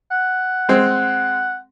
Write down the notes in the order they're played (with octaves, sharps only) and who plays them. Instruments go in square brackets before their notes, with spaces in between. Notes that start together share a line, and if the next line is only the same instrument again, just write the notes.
[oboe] F#5
[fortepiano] G#3 C4